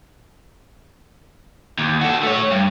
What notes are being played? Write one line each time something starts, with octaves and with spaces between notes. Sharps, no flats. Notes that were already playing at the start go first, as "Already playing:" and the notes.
D#2
F#4 A4
A3 C#5
G2